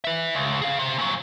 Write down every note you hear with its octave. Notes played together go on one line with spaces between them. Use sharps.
B4 E5
C#2
G#4 F5
C3
A#2 F#3